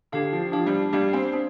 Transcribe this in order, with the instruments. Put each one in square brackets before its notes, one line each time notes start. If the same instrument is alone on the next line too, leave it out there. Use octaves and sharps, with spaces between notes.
[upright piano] D3 [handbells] D4 G4 F5
[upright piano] F3
[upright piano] F3 [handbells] D4 G4 F5
[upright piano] G3
[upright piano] G3 [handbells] D4 G4 F5
[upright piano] C4
[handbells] D4